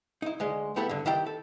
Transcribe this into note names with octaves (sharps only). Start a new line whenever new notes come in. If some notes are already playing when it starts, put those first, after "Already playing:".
D#4 E4
D2 G#3 D#5
A3 B3 E4 G4 A4
G2 D3
D#3 E4 G4 G5
A4